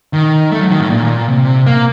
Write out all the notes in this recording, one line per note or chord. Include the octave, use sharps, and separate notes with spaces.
D#3
A3
F#3
D#3
A2
A#2
C3
A#3